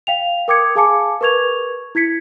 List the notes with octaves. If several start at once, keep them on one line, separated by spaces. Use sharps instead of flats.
F5 G5 F7
A#4 G5 D6 D#6 G#6 C#7
G#4 F5 G#5 A5 D6 C#7
A#4 B4 C#6 G#6 F7
E4 G#6 B6 C#7